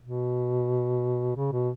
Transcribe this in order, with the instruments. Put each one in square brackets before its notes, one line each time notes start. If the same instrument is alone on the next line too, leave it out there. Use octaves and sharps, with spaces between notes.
[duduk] B2
C#3
B2